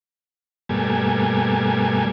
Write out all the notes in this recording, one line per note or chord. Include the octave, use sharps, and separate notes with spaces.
G2 B2 G3 A3 A#3 G#5